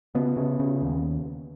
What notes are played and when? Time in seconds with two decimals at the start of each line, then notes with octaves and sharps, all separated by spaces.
0.15 C#3 B3
0.37 C#3
0.59 C#3
0.82 D#2